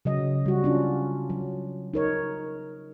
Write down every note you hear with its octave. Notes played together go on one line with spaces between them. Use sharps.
C#3 F#3 D#5
G3 F#4
C#4 D4 F4
F#3
D#4 A#4 C#5